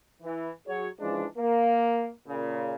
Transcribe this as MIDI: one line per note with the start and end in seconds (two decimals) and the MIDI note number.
0.23 0.50 52
0.67 0.88 54
0.67 0.88 66
0.67 0.88 68
0.67 0.88 73
1.00 1.25 49
1.00 1.25 52
1.00 1.25 53
1.00 1.25 56
1.00 1.25 62
1.38 2.10 58
2.28 2.75 46
2.28 2.75 49